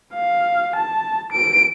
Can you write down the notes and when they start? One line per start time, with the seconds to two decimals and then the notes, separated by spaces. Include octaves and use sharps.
0.14 F5
0.76 A5
1.32 D7